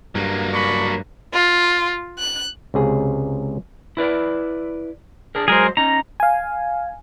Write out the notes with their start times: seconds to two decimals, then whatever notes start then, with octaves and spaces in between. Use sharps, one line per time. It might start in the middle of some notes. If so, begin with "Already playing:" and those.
0.15 G2 F#3 A#3
0.53 D4 B5 C#6
1.34 F4
2.19 F#6
2.74 C#2 C3 G#4
3.97 E4 B4 D5
5.35 D4 G#4 A#4
5.48 F#3 G#3 G#4 A#4 C5
5.77 C#4 D#4 A#5
6.20 F5 G#5